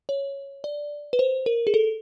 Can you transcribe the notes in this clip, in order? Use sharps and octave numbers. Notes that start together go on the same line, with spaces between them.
C#5
D5
B4
C5
A#4
G#4
A4